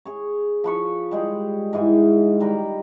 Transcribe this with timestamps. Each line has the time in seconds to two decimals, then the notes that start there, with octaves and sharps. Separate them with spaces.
0.05 G#4 C#5
0.64 F3 B4 C#6
1.11 G3 G#3 G4
1.73 G#2 E3 G#4 G#5
2.40 D#3 G3 A#4 B4